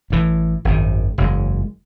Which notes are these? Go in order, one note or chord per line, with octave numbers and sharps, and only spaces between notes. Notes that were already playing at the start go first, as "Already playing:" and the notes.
A1 A2 E3
G#1 F#2 D#3
F#1 E2 C#3 G#3